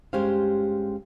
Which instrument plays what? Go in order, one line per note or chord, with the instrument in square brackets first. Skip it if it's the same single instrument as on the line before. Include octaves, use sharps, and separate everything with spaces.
[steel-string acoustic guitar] G2 G#3 C#4 G4 C5 F5